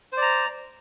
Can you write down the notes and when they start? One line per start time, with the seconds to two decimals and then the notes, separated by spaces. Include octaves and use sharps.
0.13 C5
0.17 D5
0.22 A#5